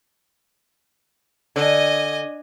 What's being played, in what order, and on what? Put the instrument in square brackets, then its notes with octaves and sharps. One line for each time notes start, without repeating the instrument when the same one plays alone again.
[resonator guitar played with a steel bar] D3 [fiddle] D#5 G#5